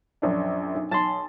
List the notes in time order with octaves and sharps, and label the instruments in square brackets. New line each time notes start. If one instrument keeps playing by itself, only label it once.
[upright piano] A#1 F#2 D4
B1
[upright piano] B1 A6 [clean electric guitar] A5 C6